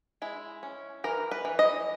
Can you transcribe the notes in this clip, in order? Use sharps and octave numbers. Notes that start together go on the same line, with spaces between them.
G#3 E4
C#4
E3 A#4
B4
E3
D#5